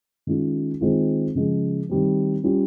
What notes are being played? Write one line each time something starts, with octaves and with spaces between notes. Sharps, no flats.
D#3 G#3 C#4 F4
D#3 G#3 C4 F4
C#3 F3 G#3
D#3 G3 C4
G3 C#4 F4